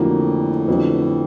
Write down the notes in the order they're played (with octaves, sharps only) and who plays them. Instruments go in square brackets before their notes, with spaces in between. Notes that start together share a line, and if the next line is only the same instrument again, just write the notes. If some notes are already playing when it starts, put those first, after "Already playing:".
Already playing: [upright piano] F2 D3 F#3 A#3 [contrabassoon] A2
[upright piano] F2 D3 F#3 B3